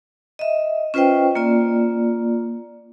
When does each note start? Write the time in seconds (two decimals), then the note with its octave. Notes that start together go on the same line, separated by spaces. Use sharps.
0.39 D#5 E5
0.94 C#4 F4 B4 C5 D#5 G5
1.35 A#3 F4 D5